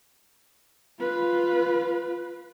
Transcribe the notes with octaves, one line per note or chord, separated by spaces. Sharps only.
F4 B4